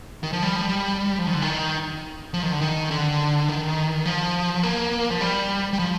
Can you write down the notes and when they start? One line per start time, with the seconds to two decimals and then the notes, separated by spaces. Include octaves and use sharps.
0.23 D#3
0.33 F3
0.43 G3
0.56 F3
0.61 G3
1.19 F3
1.27 D#3
1.34 D3
1.42 D#3
2.34 F3
2.43 D#3
2.52 D3
2.61 D#3
2.91 D3
3.48 D#3
4.06 F3
4.63 A#3
5.10 F3
5.21 G3
5.73 G3
5.79 F3